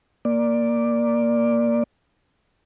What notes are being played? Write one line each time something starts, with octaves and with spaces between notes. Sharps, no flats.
A#3 D5